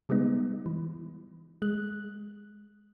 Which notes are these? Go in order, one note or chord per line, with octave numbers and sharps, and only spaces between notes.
C#3 G3 G#3 B3 D#4
E3
G#3 F#6